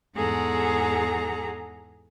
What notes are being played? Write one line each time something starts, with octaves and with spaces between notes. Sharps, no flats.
E2 G#2 G#4 A4 F#5 A#5